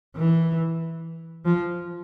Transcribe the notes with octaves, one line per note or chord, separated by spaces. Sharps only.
E3
F3